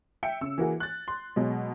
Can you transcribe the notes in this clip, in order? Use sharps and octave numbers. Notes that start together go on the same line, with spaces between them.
E5 G5 C#7
C#3 E6
E3 A#3 F#4 G#4
F#6 A6
C6
B2 F#3 G#3